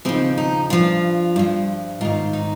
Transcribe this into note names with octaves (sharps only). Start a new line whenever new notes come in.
D#2 C#3 F3 C4
D#4
G2 F3 F4
G2 F3
G#2 D#3 F4
D#4